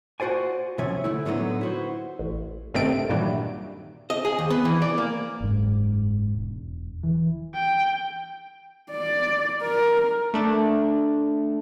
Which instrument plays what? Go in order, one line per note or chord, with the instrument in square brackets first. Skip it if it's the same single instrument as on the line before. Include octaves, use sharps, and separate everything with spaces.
[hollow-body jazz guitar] F4 F#4 C5 D5 G#5
B1 C3 F3 C#4 E5 G#5
D3 A3 E4
A2 D3 F#3 G3 B3 D#4
E4 F#4 C5
[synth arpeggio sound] A1
G2 C3 D#3 A3 C4 D7
G2 A#2 D#3 E3 F#3 G3
[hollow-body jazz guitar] D#5
G#4
D#2
B3
E3
D5
A#3
[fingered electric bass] F#1 G#2
E1
E3
[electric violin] G5
[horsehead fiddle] D5
A#4
[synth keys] A3 D4